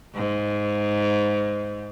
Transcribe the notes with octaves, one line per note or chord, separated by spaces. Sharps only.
G#2